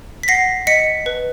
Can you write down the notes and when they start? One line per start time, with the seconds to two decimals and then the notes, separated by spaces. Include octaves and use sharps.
0.23 B6
0.28 F#5 A#6 C7
0.67 D#5 B6 C#7
1.06 B4